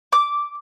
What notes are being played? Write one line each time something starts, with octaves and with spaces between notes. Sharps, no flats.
D6